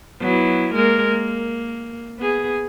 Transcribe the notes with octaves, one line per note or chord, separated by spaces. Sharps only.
F#3 B3 E4
G#3 A#3 A#4
A#3
B3 G#4